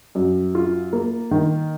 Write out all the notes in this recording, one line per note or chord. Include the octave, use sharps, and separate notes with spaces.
F#2
F4
A#3
D#3